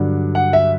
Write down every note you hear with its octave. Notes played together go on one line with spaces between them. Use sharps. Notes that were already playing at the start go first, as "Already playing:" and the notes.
Already playing: G2 D3 F#3
F#5
E5